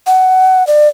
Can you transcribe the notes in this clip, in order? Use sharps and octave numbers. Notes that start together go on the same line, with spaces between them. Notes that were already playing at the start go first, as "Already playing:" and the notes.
F#5
D5